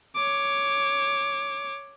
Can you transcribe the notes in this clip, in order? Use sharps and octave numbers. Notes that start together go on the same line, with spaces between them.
C#5 D6